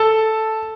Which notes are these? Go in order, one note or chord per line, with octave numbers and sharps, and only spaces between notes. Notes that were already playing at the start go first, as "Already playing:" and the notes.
Already playing: A4 A5